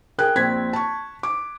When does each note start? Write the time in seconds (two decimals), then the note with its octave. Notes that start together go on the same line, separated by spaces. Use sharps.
0.18 G#4 A#4 G5 F#6
0.36 A#1 C4 G#6 B6
0.73 A5 C#6
1.23 D6